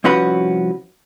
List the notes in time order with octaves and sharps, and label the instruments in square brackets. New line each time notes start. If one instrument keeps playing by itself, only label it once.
[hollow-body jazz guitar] C2 F3 C#4 F#4 B4